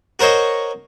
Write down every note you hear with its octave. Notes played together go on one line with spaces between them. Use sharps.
F#4 A#4 C5 C#5 D#5